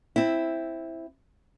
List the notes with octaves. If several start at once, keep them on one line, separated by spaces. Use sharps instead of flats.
C4 E4